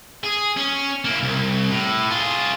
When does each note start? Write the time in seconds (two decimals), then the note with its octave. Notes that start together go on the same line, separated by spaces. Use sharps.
0.24 G#4
0.57 C#4
1.05 A#3 E4
1.23 C2
1.70 A2
2.11 F4 G#4